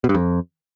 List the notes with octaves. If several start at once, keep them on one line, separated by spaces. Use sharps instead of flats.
B2
G2
F2